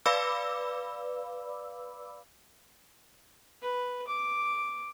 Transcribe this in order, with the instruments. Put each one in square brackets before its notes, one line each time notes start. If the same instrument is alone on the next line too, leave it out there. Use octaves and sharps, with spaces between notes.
[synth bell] B4 D5 F5 B5 D6 E6
[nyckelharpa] B4
D6